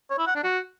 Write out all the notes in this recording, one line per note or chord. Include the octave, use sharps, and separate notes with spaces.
C#5
E4
F#5
D4
F#4